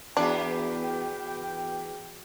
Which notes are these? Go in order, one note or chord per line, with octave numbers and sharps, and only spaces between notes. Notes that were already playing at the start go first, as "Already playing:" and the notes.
E2 B3 D4 F#4 G#4 G5 D6